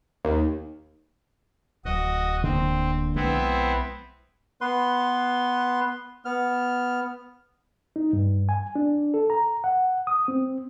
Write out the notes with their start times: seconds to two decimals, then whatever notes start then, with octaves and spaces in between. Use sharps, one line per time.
0.25 D#2
1.85 D1 F#3 F#4 D#5
2.43 D3 A#3 C4
3.16 B1 F3 G#3 B3 C4 E4
4.61 B3 B4 C6
6.25 B3 F6
7.96 D#4
8.13 G2
8.49 G#5
8.76 D4
9.14 A4
9.30 A#5
9.64 F#5
10.07 D#6
10.28 C4